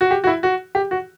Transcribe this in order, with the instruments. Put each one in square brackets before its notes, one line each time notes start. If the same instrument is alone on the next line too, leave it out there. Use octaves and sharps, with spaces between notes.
[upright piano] F#4
G4
F#4
E4
F#4
G4
F#4